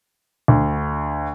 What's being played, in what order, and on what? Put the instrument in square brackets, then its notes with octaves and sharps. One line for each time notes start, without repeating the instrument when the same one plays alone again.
[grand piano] D2